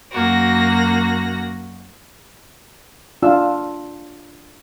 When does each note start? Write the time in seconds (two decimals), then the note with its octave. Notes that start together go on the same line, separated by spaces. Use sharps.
0.12 F#2 A#3 F#4 A#6
3.23 D4 F4 E6